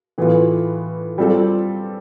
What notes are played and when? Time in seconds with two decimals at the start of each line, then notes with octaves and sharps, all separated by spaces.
0.18 A2 E3 B3 F4
1.18 G3 C4 F4 A4